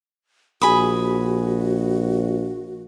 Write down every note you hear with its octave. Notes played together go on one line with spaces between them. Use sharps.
A#1 F#4 G#4 B5 D#6